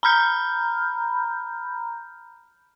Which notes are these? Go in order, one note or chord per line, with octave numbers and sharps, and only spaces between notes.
A#5 B5 F6 G6